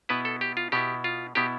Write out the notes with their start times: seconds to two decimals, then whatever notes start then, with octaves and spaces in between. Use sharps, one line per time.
0.09 B2 B3 E4 B4
0.25 A4
0.41 G4
0.57 F4
0.72 B2 B3 E4 G4
1.04 F4
1.35 B2 B3 E4 G4